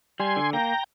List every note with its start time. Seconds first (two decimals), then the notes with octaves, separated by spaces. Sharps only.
0.20 G3 G#5 C6
0.36 D3
0.53 A#3 G5 A#5